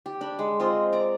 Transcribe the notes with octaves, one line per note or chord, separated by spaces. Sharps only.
G4
D4 B5
G#3
C4 F4 D#5
D5 A#5